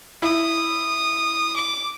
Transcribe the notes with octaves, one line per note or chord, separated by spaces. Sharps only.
E4 D#6
D6